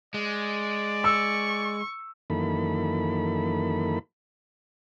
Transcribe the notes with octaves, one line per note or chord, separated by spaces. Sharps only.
G#3 D5
C#6 E6
F#2 D#3 E3 A#3 A4 B5